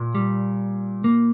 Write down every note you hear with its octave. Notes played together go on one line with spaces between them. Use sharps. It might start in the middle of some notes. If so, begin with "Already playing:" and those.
Already playing: A#2
G3
A#3